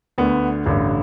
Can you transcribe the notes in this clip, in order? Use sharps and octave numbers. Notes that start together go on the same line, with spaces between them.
D2 D3 B3
A1 G2 D3